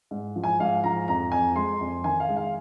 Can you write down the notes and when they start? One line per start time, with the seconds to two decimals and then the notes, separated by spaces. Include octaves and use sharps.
0.11 G#2
0.36 F3
0.44 G#5
0.60 G#2 F5
0.84 F3 A#5
1.08 F2 A#5
1.32 F2 G#5
1.56 G#3 C6
1.80 F2
2.04 D#3 G#5
2.20 F5
2.29 G#3
2.36 F5